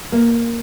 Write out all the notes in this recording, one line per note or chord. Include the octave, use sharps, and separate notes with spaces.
A#3